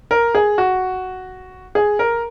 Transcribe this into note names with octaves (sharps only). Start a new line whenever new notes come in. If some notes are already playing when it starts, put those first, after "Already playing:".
A#4
G#4
F#4
G#4
A#4